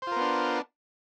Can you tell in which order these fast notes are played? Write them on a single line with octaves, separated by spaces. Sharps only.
C5 F4 A#4 B3 D4